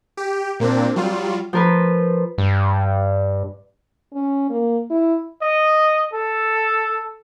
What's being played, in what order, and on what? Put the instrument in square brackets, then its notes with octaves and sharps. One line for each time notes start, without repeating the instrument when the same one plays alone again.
[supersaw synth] G4
A#2 A#3 C4 D4
F#3 G3 F4
[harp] F3 A#4 B4
[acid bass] G2
[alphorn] C#4
A#3
E4
[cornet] D#5
A4